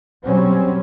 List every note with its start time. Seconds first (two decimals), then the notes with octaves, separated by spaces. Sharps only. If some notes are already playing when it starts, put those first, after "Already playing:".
0.24 B2 F#3 G3 C4 C#4